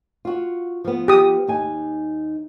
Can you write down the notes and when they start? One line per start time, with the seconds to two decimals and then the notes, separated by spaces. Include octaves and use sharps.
0.25 F4 F#4
0.84 F3 B3
1.08 G4 D#6
1.47 D#2 D#4 G#5